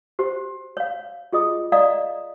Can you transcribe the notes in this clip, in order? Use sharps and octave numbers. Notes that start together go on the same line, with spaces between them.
G4 C5
C#5 F5
F4 G#4 D#5 D#6
D5 D#5 F5 A#5 D#6